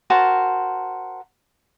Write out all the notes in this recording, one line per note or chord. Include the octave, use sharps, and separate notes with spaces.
F#4 A#4 C5 A5